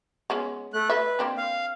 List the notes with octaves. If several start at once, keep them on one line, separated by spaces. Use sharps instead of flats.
G#3 B3 C#4
A3 F#6
B4 D#5 E5
A#3 C4 D4
F5